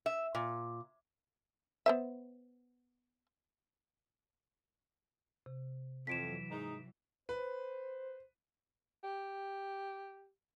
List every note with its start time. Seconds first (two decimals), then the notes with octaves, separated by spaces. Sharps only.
0.06 E5
0.35 A#2
1.86 B3 C5 E5
5.46 C3
6.07 F2 E3 F#3 B6 D7 E7
6.50 G#2 D#4
7.29 B4 C5
9.04 G4